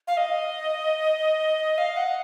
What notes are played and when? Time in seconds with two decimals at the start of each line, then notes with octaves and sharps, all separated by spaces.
0.07 F5
0.17 D#5
1.78 F5
1.96 F#5